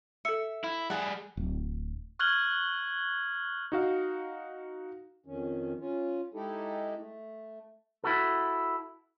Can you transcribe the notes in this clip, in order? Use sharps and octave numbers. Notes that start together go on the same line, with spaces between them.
A4 E5 C#7
E4
G3 G#4 F#5 A5
D1
C#6 F6 F#6 G#6 F#7 G7
D#4 F#4 F5
F2 D#3 C#4
C#4 F4
G#3 D#4 E4 G4 A4
A3
E4 F#4 A4